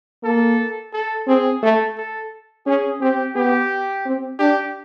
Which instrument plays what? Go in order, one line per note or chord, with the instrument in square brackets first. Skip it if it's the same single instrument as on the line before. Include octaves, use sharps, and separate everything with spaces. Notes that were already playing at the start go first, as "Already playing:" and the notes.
[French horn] A#3 [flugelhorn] A4
[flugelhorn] A4
[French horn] C4 [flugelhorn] G#4
[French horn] A3 [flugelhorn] A4
[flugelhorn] A4
[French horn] C#4 [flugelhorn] G#4
[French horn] C4 [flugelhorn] G4
[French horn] B3 [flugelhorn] G4
[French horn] C4
[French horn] D4 [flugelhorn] G4